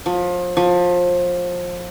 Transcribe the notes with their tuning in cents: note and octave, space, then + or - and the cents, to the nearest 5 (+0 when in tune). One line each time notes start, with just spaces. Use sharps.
F3 +30
F3 +25